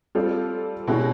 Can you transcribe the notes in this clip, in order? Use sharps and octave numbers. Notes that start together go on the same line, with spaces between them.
G3 C4 F4 A4 D5
B2 G#3 C#4 E4 G4